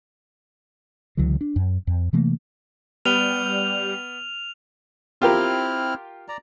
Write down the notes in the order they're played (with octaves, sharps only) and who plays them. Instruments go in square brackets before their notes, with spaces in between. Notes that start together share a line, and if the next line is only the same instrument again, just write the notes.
[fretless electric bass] C#2 D3 E3 F#3
D4
F#2
F2
C3 E3 A3 A#3
[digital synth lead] G3 [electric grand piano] B3 [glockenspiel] F6 D#7 G7 [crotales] F7
[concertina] C4 E4 F6 [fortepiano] F4 G4 A#4
[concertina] D5 A#5